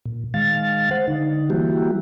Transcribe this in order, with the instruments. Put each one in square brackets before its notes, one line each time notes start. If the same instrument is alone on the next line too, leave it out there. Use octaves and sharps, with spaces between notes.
[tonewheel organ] A#2
D#3 G#3 F5 A6
C5 F#5
D3 D#4
E3 G3 A#3 E4 F#4 G4